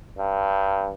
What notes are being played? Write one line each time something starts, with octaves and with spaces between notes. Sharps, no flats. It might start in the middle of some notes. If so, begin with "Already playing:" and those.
G2